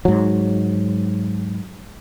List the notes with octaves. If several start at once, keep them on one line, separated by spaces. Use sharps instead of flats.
G#2 F#3